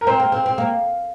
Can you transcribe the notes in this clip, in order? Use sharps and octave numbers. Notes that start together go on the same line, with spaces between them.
A#4
C4 C5
A#3
C4
C4
A#3